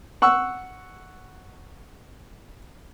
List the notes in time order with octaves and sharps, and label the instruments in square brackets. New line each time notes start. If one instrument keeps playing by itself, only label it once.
[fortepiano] F#5 C#6 E6